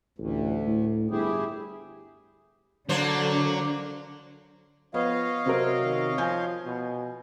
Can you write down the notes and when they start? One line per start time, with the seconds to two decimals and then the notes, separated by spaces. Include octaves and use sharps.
0.18 A1 D2
0.67 A2
1.11 G1 E4 G4 G#4
2.89 D3 F#3 A#3 D4 C5
4.94 F3 B3 C#5 D#5 F5
5.46 C3 F#3 A#4 C5
5.82 D#3
6.18 F3 G#5 G6
6.66 B2